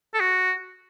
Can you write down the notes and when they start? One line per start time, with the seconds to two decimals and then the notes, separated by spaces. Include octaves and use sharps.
0.14 A4
0.20 F#4